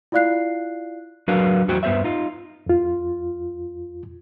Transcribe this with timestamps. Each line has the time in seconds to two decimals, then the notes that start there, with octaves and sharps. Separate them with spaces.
0.12 E4 F4 D5 F5 F#6 C7
1.28 F#3 D4 F#4 A#4 B4 F5
1.68 E2 A2 F#3 F#4 C5 G5
1.83 G2 B3 C5 D5 E5
2.04 D#4 F4
2.66 F2 F4